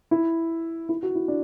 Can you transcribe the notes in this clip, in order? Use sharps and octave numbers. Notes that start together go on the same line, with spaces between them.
E4
E4
F#4
E4
D4